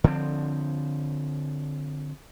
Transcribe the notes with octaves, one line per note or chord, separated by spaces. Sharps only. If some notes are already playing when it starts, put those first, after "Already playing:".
D3 F3 G3 C4